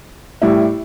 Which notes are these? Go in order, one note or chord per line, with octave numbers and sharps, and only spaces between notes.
A2 G3 E4